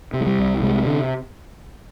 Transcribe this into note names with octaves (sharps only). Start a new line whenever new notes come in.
C3
G#3
G3
C2
C3 G#3
D3